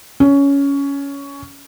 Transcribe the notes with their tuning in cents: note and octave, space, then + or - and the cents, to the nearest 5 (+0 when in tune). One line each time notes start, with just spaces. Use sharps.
C#4 +15